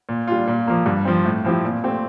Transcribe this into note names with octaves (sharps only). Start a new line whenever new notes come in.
A#2
G3 D4 F4
A#2
F3 A#3
G2
F3 C4
A2
F3 C4 E4 G4
A#2
A3 C4 G4